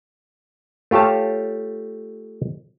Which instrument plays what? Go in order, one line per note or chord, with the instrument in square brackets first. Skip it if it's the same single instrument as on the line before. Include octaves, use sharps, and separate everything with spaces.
[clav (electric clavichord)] A3 F4 G4 C#5 A5